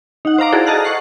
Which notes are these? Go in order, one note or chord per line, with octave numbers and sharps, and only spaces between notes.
D#4 F#5
C5 F5 A#5 D6
E4 F#4 G#4 A4 D5
G#4 D#5 A5 A#5 F6 F#6
F#5 C#6 F#6 C7